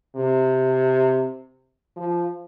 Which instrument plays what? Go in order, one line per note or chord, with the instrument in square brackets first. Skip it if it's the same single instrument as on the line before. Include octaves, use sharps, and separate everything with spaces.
[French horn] C3
F3